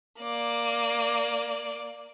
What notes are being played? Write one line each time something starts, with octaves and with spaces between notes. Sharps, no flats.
A#3 D5